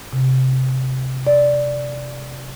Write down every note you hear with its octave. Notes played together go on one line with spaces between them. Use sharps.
C3
D5